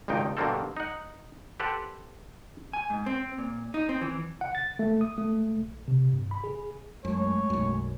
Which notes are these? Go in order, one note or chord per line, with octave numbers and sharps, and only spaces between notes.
G#1 C#2 G2 D#4 G5
G2 B2 D3 A#3 C4 A4
D#4 F#5
G4 A4 B4 C5 F#5
G#5
G#2
C4
A#2
D#4
C4
E3
F#5
A6
A3
D#6
A3
A#1
C3
G2
B5
G#4
F#2 G#3 A3 C#5
B1 F#2